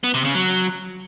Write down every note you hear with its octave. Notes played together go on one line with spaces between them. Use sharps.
B3
C3
C#3
F#3